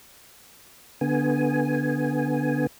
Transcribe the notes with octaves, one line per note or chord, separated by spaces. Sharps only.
D3 B3 G#5